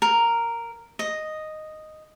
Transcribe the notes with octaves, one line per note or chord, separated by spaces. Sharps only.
A#4
D#5